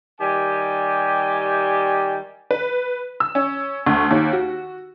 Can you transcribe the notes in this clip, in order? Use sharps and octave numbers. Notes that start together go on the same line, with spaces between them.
D#3 G3 G4 G#5
B4
E6
C#4
D2
D#2
F#4